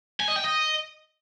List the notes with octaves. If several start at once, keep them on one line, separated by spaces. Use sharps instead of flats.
G#5
D#5
G5
D#5